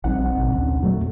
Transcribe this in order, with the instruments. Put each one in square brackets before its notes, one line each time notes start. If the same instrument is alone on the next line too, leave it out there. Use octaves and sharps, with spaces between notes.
[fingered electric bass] A#1 G3 [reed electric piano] C4 D#4 F#5
[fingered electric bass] A1 B2 D3
D2 G3 C#4
[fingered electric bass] F2 A#2 [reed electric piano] F#3 A3